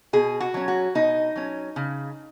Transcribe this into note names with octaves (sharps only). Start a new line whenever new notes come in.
B2 G#4
F#4
F#3 C#4
F#4
B2 D#4
F#3 C#4
C#3